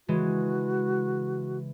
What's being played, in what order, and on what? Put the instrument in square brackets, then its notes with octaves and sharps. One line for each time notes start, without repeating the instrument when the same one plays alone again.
[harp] C#3 E3 G#3 [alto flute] F#4